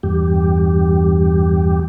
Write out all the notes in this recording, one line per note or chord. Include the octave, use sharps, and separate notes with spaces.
E2 G2 G4